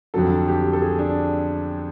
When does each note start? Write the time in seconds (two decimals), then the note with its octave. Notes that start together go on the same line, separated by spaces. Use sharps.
0.14 F2 D3 F#3 A4
0.48 G4
0.73 A4
0.82 G#4
0.99 D4